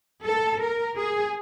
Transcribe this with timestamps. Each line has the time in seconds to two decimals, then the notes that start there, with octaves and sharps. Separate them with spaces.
0.24 A4
0.61 A#4
0.97 G#4